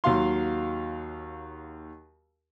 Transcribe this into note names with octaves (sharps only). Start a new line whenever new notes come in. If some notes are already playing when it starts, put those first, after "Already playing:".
D#2 F#3 F5 C6